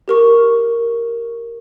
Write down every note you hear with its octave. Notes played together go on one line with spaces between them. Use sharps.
G4 A#4 C#6